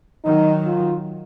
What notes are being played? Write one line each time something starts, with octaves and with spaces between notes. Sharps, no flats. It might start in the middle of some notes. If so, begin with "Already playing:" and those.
D#3 F#3 D#4
F4